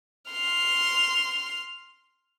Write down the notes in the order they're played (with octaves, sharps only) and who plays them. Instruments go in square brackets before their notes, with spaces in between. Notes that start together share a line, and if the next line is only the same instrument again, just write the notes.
[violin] C6 F6